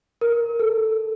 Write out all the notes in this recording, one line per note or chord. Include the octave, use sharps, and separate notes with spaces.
A#4
A4